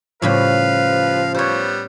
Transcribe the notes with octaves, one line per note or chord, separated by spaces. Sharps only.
A2 C#3 F3 G3 B4 F5
G3 B3 C5 C#5